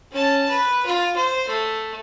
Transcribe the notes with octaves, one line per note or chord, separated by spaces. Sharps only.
C#4 A5
B4
F4
C5
A3